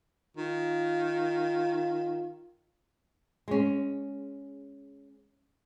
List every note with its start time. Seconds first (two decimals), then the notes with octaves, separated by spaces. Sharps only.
0.37 D#3 F4
3.48 G#3 C#4